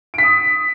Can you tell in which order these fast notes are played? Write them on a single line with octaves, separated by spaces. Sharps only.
D7 B6 D#6